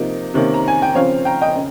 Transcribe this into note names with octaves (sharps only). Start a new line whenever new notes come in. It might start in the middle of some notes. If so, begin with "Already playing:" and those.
Already playing: C3 F3 A#3 D#4
C3 D#3 A#3 C#4
A#5
G#5
G5
C#3 F3 C4 C#5 F5
G5 A#5
D#5 G5
C#3